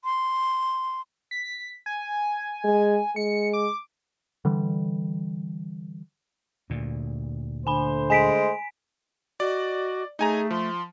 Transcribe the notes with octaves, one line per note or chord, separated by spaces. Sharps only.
C6
B6
G#5
G#3
G#3 C#7
D6
D3 E3 G3
D2 A#2
D3 A3 C5 G#5 B5
G#3 G#5 B6 D7
F#4 D5 D#5
A3 D#4 G#4 G#5 A#5
F3 C6